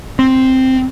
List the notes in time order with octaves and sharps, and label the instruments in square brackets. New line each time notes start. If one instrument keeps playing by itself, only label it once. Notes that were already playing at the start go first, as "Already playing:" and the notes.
[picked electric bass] C4